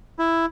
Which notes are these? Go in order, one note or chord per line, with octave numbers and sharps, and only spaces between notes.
E4